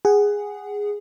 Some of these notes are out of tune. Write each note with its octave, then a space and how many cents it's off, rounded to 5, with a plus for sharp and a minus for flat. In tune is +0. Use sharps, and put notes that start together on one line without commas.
G#4 -10 F#5 +15